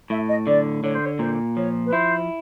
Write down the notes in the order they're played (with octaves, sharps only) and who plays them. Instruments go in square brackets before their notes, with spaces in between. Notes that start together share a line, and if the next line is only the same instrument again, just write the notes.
[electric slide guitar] A2 [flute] E5
[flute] D#5
[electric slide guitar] D3 [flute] D5
[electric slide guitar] D3 [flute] C#5
[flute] C5
C#5
[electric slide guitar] A#2 [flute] C5
[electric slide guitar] F3 [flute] C#5
[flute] B4
[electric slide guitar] E4 [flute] C5